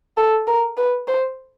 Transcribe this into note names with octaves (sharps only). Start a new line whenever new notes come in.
A4
A#4
B4
C5